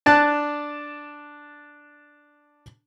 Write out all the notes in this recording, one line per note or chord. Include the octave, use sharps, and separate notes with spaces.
D4 A5 F#6